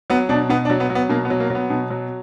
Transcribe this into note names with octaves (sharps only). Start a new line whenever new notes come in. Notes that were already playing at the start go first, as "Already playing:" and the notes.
F#3 B3
B2 D4
B2 B3
D4
F#3
B3
F#3
B3
B2 A#3
B3
F#3
A#3
F#3 B3
B2
F#3